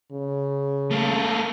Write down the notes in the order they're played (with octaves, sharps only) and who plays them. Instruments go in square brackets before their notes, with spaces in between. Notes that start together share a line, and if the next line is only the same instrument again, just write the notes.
[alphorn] C#3
[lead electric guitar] A3 A#3